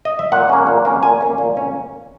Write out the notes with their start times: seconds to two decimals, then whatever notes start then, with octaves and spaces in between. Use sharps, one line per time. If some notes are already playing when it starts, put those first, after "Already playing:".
0.05 D#5
0.19 E5
0.32 A#2 F#5
0.49 A#3 C#4
0.67 A#2
0.85 A#3 C#4
1.03 A#2 G#5
1.21 A#3 C#4
1.38 A#2
1.56 A#3 C#4